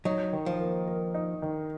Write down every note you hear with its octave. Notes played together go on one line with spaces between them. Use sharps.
F#3 D#4
D#3
F3
A#3
A#4
D#4
D#3